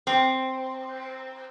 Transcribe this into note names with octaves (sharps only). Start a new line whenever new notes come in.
C4